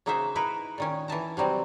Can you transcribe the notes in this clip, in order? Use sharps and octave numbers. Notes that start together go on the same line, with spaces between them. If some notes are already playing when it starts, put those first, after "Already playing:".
C#3 A#3 D#4 F#4 C5 E5
D#4 E4 A#4 B4
A#2 D#3 C#4
E3 E5 A5 A#5
C3 F#3 G3 C4